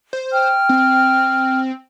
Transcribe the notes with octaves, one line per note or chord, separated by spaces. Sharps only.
C5
G5 F6
C4